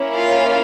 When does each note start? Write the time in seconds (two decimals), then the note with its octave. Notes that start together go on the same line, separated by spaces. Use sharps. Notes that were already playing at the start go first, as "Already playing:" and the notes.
Already playing: A#3 C#4 E4
0.16 F4 F5